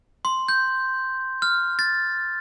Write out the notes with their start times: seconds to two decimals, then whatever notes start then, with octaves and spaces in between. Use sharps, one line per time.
0.25 C6
0.49 G6
1.42 F6
1.79 A6